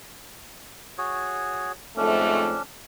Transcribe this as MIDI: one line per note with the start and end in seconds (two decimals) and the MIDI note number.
0.98 1.72 66
0.98 1.72 68
0.98 1.72 73
1.97 2.56 41
1.97 2.56 44
1.97 2.56 57
1.97 2.62 61
1.97 2.62 62